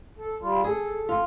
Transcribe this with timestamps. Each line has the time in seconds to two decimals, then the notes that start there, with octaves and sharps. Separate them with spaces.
0.19 A4
0.42 G3 F4
0.64 G#4 A4
1.09 F4